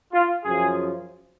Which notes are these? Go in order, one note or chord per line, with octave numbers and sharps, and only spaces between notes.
F4
F#2 C#3 F3 G#4